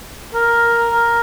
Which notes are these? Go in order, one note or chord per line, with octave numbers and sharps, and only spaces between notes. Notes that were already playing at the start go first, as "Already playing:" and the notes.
A#4
A#4